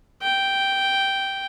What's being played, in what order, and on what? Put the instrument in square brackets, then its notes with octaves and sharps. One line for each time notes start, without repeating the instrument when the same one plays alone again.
[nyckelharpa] G5